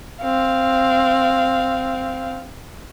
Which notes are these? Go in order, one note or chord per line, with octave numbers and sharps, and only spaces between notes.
C4 F5